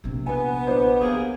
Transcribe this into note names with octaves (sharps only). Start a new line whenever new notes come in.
A#1 C3
B3 B4 G#5
D4 D#4 C5
C3 A#3 B3 G#4